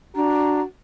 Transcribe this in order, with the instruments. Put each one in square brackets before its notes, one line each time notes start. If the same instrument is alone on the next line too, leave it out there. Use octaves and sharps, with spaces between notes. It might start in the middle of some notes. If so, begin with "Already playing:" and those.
[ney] D4 [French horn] F#4 [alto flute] A#5